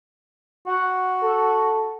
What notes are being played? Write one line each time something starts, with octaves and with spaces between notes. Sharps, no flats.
F#4 F#5
A4